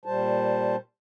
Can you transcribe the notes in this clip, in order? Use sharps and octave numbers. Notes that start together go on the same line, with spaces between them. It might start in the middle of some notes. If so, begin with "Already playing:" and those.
A#2 G3 C5 A5